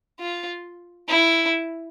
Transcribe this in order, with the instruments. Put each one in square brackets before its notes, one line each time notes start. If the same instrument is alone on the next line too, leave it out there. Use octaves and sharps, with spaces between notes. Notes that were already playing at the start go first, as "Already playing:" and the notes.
[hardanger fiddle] F4
E4